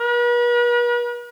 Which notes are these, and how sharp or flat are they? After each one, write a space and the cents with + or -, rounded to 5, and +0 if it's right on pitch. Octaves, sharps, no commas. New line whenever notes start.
B4 -45